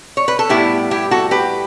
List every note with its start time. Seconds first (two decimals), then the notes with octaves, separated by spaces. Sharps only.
0.17 C#5
0.28 B4
0.39 A4
0.49 A2 G3 B3 E4 G4
0.91 E4 G4
1.11 F#4 A4
1.31 G4 B4